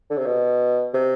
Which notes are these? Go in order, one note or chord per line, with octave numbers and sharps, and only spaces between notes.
D3
C3
B2
C3